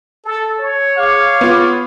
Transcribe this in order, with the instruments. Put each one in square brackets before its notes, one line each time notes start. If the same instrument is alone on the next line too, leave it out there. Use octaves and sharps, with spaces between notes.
[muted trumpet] A4
C#5
[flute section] G#4 D6 [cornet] F5
[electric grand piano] B3 F4